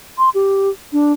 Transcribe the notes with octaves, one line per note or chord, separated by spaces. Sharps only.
C6
G4
D4